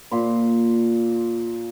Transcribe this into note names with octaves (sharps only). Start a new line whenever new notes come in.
A#2 C6